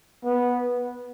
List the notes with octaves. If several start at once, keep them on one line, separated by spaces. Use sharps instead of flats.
B3